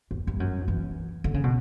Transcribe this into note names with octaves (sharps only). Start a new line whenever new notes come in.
E2
G2
F#2
E3
D3
C#3
B2